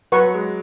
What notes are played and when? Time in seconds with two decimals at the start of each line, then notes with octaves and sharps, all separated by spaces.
0.12 F#3 B4 F#5 C#6
0.34 G#3